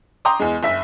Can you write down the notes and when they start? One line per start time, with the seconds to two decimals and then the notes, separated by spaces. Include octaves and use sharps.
0.25 G5 A#5 C6 D6 D#6
0.40 E2 G#3
0.63 F#1 E5 B6